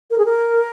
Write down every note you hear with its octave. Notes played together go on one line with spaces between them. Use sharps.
A#4
G#4
A#4